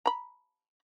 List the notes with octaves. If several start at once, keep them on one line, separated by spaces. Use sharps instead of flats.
A#5 B5